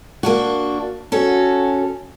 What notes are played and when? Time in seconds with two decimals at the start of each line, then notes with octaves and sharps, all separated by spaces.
0.23 A#3 D4 F#4
1.12 C#4 F#4 A4